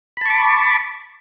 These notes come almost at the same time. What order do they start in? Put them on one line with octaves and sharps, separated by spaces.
B5 A5 C#6 D6